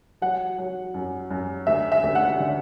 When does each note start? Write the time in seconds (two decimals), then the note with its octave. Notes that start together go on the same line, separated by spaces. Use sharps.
0.22 F#3 F#5
0.58 F#3
0.94 F#2
1.31 F#2
1.67 D2 E5
1.92 E5
2.04 D2
2.15 F#5
2.40 D3